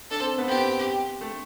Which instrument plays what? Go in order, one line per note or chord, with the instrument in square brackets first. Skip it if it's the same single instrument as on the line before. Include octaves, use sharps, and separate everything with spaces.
[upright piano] D4 [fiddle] A4
[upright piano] C4
B3
[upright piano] C4 [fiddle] G4
[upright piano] A3